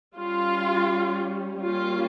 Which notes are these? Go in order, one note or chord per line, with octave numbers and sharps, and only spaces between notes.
G3 C#4 F4
G3 A#3 C#4 F4